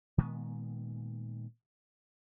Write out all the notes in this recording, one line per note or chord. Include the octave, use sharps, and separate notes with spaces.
A#2 D#3 G#3 B3